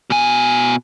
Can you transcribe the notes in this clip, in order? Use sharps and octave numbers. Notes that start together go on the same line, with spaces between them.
B2 G#5